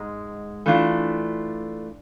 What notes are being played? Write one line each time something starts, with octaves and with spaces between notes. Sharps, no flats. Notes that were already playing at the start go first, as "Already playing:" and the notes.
Already playing: G#2 G#3
E3 A3 D4 F4